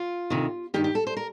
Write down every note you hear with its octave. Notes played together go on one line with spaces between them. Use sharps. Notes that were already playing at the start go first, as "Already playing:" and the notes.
Already playing: F4
D2 C3 D#3
G2 D#3 G4
G4
A4
C5
A#4